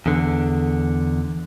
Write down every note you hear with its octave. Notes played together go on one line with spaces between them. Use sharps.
E2 D3